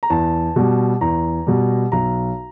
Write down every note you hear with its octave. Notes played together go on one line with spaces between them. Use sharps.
A#5
E2 A5
B2 G3
E2 A#5
B2 G3
B1 A#5